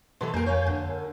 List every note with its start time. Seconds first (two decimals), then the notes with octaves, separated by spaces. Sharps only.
0.21 B2 E3 A4 A5 C6
0.34 F2 A#3 A#4 G#5 G6
0.46 C#5 F5
0.66 D3
0.89 A#4